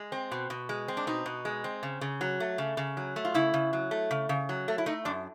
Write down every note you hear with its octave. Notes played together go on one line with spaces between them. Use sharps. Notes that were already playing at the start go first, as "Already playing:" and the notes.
Already playing: G#3
C4
B2
B2
G#3
C4
D4
B2 D#4
B2
G#3
C4
C#3
C#3
F#3
A3
C#3
C#3
F#3
A3
F4
C#3 E4
C#3
F#3
A3
C#3
C#3
F#3
A3
E4
A3 D#4
F#2 D4